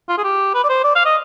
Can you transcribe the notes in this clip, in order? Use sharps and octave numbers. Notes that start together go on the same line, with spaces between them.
F4
G#4
G4
B4
D5
C5
D5
F5
D#5